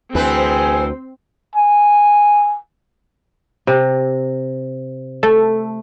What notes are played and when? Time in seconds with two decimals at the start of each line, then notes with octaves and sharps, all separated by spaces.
0.15 D2 E3 C4 G#4 B4 C5 G5 G#5
1.56 G#5
3.67 C3
5.23 A3 A4